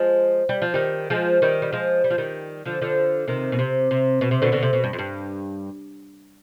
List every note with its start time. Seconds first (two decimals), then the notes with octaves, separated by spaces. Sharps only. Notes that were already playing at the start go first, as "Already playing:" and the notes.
Already playing: F3 G#3
0.49 G3
0.62 F3
0.74 D#3 G3
1.10 F3 G#3
1.42 D#3 G3
1.62 G3
1.72 F3 G#3
2.04 G3
2.10 F3
2.18 D#3 G3
2.65 D3 F3
2.82 D3 F3
3.28 C3 D#3
3.52 B2
3.59 C3
3.91 C3
4.21 B2
4.31 C3
4.42 B2 D3
4.52 B2 D3
4.63 C3
4.73 B2
4.84 G2
4.93 F2
4.99 G2